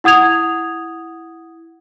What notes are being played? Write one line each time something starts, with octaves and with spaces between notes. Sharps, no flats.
E4 F#5 D#6 G#6 F7